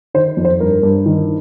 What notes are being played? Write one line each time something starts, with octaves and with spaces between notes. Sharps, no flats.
D#3 C5
F2
C5
G2 A#4
G2
D#3